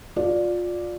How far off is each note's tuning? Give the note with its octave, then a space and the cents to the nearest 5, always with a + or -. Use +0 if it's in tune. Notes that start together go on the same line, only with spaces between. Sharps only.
F4 +25 D5 +0